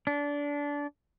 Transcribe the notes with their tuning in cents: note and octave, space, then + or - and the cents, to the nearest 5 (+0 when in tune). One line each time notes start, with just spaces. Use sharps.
D4 -20